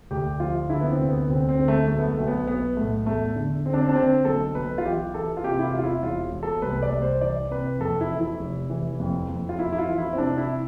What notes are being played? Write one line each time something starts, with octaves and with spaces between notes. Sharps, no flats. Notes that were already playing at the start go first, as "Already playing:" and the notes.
D2 G4
F3 F4
D3 E4
B3
C4
D2
B3
D2 C4
C4
D3
A3
B1 A3
B3
A3
B1
B3
B1 B3
A2 A3
E2 A3
D3
D3 C4
D4
C4
D4
D3 C4
B1 A4
B1 B4
F4
E3 G4
E3 A4
F4
C3 G4
E4
F4
E1
F4
E4
E1 F4
E1
A4
C2 B4
D5
C2
C5
E3 D5
C3 B4
F2 A4
E4
E3
E4
F1
E3
F2
F2
F4
F2 E4
E4
F4
E3
E4
C4
C3 D4
E4